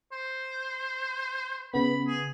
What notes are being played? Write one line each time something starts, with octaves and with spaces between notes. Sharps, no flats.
C5
C#3 B3 B5
G#4